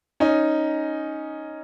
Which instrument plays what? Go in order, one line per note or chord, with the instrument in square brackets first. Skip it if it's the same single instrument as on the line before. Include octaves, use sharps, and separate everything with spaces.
[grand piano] C#4 D#4